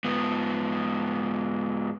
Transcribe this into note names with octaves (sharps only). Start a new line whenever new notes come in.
G#2 B3